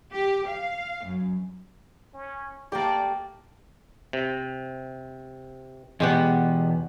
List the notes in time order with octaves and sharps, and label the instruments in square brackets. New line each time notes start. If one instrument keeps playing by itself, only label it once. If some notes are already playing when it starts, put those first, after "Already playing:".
[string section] G4
F5
F#2
[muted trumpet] C#4
[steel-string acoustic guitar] A3 G5 A5 [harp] A#3 G4 [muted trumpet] D5
[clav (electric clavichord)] C3
[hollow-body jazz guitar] E2 B2 B3 [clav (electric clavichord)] G#3 G4 F#5